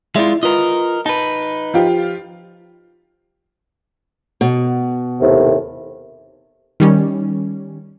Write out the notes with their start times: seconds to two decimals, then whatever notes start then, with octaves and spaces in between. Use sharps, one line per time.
0.16 G#3 E4 F4 D5 E5
0.43 F4 A#4 B4 D#5
1.06 D#4 B4 A5
1.74 F3 F4 G4
4.41 B2
5.19 D#2 A2 C3
6.80 D#3 G3 C#4